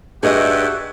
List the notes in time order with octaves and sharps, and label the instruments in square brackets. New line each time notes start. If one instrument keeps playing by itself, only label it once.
[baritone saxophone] G2 [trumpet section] F#4 E5 [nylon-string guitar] G#4 D#5